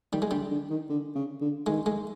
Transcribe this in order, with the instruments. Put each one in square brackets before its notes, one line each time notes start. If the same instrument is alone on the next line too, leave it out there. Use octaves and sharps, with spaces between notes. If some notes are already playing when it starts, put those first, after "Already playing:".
[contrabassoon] D#3 [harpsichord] G3
[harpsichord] G#3
[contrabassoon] D3 [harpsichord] G3
[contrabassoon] D3
D#3
D3
C#3
D3
[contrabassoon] D#3 [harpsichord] G#3
[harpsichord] G#3